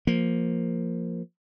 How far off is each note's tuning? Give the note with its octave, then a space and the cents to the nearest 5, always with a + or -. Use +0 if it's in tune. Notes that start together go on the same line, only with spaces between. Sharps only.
F3 +0 A#3 +0